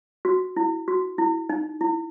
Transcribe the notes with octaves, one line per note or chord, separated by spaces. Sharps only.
F#4
E4
F#4
E4
D#4
E4